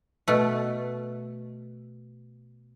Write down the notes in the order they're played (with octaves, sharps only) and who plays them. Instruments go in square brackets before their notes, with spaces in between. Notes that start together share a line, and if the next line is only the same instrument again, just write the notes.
[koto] B2 A3